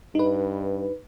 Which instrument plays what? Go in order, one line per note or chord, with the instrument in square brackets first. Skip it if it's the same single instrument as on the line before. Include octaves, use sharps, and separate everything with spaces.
[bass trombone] G2 [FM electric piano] D#4 B4